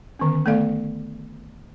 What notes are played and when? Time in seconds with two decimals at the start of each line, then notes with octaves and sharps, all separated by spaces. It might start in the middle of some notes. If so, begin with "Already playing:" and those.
0.19 D3 D#3 B3 C#4
0.46 A3 B3 A4 D5 F5